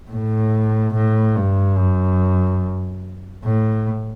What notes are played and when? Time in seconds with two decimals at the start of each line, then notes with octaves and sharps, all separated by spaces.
0.11 A2
0.95 A2
1.36 G2
1.78 F#2
3.45 A2